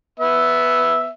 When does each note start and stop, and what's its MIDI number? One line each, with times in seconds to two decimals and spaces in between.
0.19 1.09 59
0.19 1.09 76